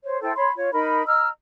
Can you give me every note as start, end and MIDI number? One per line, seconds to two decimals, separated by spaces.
0.04 0.19 72
0.04 0.19 73
0.22 0.33 64
0.22 0.33 69
0.22 0.33 72
0.22 0.33 79
0.35 0.52 73
0.35 0.52 83
0.35 0.52 84
0.56 0.72 65
0.56 0.72 73
0.73 1.05 63
0.73 1.05 70
0.73 1.05 83
1.07 1.28 75
1.07 1.28 82
1.07 1.28 88
1.07 1.28 89